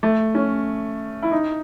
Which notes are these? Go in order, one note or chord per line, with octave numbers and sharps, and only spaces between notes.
A3
C#4
E4
D#4